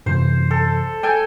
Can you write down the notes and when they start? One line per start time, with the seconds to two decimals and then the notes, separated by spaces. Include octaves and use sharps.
0.06 F#2 C3 E3 C5
0.51 A4
1.03 A4 G5 G#5